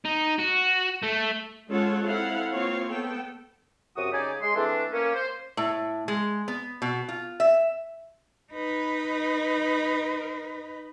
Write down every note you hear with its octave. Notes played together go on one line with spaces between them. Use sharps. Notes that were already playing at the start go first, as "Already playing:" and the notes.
D#4
F#4
A3
G#3 C#4 F4 A4 C#5 F#5
C4 E4 A4 F5 F#5
A#3 C4 F4 C#5 F5
B3 A4 G5
F#2 C3 F#4 D#6
C#3 C#4 D#4 G4 D5 G#5
G#3 C6
E3 A3 C4 D4
A#3 C#4
C5
A2
G#3
B3
B2
F4
E5
D#4 B4